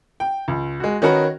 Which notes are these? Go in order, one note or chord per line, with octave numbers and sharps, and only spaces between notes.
G5
C#2
G#3 F#4
D#3 C#4 D#4 F#4 A#4 B4